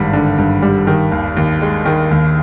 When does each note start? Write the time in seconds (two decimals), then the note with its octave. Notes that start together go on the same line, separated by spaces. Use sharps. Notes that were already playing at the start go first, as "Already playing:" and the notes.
Already playing: G#1 G2 G3
0.13 D3
0.38 G2
0.62 G3
0.87 D#3
1.12 D#2
1.37 D#2
1.62 G#3
1.85 D#3
2.11 D#2